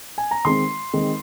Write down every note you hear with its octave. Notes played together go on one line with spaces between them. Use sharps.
G#5
A#5
D#3 G#3 C4 C6
D#3 G#3 C4